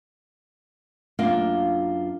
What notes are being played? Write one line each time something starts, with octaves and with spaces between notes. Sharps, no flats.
F#2 A#3 D4 F4 F5 F#5